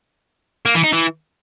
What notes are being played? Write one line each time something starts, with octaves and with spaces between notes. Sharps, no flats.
A#3
E3
D#4
E3